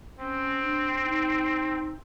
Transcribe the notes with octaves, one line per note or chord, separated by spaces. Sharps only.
C4 C#4
D4
D#4